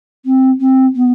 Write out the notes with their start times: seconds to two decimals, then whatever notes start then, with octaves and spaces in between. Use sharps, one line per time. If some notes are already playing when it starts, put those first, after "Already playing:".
0.25 C4
0.60 C4
0.96 B3